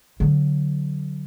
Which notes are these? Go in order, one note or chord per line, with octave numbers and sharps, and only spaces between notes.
D3 F#3